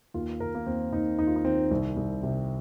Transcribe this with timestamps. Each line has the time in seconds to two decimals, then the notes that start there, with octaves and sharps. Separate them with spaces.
0.14 D#2 F4
0.40 D#2 A#4
0.55 A#3
0.66 D#2 C4
0.93 D#2 D#4
1.18 D#2 D#4
1.27 F4
1.36 D#4
1.45 D#3 C4
1.71 C2
1.97 C2
2.23 C3